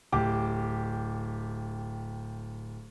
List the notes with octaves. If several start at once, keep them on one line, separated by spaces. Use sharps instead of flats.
D1 G4 D6